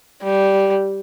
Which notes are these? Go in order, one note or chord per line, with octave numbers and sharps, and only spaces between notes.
G3